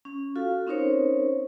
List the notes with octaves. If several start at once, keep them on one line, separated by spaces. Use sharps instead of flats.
C#4
F4 F#4 A4 F5
C4 C#4 D#4 A#4 C5 C#5